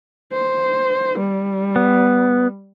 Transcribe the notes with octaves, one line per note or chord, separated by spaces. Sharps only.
C5
G3
B3